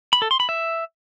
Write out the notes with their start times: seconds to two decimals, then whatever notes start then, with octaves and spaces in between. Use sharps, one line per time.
0.13 B5
0.22 A4
0.31 C6
0.40 B5
0.49 E5